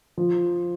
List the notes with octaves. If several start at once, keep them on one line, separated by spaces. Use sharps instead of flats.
F3